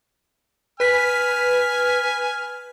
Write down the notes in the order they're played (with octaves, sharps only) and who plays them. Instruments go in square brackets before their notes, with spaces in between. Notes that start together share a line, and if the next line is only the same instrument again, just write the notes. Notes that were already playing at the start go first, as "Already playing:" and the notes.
[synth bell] B4 B6 [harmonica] G#5 F6